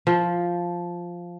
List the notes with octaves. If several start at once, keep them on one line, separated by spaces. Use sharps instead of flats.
F3